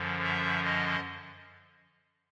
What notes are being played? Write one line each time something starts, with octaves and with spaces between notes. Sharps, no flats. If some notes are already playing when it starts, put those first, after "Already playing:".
Already playing: F#2 D3 F3
E5
D#5